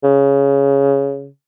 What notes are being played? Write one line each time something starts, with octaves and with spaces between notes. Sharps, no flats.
C#3